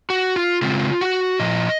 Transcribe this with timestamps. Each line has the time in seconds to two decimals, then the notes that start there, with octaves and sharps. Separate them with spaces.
0.10 F#4
0.36 F4
0.62 C#3 G#3 C4 F4
1.01 F#4
1.40 A#2 F3 D#5